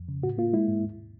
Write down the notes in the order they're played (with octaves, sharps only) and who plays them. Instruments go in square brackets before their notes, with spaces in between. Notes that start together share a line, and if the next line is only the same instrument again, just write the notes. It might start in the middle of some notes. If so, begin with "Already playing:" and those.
Already playing: [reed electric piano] F2
C#3
A2 F#4
A#3 F4
G#3 E4
G#2
D#2